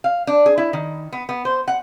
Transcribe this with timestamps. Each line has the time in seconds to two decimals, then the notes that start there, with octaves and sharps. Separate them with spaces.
0.04 F5
0.27 D4
0.46 G#4
0.58 E4
0.73 D#3
1.13 B3
1.29 B3
1.45 C5
1.68 F#5